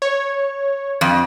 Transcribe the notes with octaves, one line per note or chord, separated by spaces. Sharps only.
C#5
F2